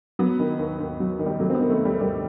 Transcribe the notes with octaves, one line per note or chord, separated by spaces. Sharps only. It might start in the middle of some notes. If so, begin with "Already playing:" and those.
F#3 B3
D#3
D#2
D#2
F#3
D#3
G3
F#3 A3
C4
B3
D#3
A3
D#2
G3
D#2 G3